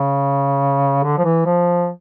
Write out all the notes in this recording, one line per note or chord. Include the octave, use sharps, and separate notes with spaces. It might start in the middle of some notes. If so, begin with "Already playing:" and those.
Already playing: C#3
D3
F3
E3
F3